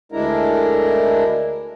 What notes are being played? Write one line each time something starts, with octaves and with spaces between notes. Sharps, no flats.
D2 G#3 D4 E4 A#4